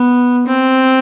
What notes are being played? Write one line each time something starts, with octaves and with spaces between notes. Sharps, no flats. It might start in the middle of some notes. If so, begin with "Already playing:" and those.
Already playing: B3
C4